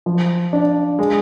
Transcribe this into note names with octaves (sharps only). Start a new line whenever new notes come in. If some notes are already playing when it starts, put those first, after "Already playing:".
F3
D4
G#3